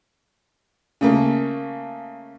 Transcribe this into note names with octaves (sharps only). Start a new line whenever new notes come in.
C#3 A3 A#3